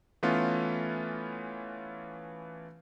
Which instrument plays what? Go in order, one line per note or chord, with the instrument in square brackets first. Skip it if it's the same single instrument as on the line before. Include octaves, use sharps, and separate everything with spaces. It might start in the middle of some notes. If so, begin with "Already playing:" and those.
[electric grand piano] E3 A3 B3 C#4 F4